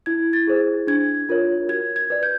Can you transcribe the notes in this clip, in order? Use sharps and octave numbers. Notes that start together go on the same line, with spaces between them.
E4 G#6
A6
G#4 C5
D4 G#6
F4 A#4 C#5
F#4 G#6
G#6
B4 D5
G6